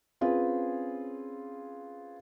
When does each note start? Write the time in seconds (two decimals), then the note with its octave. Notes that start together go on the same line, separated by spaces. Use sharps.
0.21 C4 C#4 F4 G#4 B4